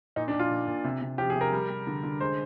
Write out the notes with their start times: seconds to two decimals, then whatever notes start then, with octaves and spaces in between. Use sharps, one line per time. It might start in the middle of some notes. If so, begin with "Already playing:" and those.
0.16 A#2 D#4
0.28 D4
0.33 A#2
0.39 F4
0.51 A#2
0.68 A#2
0.84 C3
1.01 C3
1.18 F3 G4
1.30 G#4
1.36 C3
1.41 A#4
1.52 G3
1.70 G3
1.87 D3
2.03 D3
2.21 G#3 C5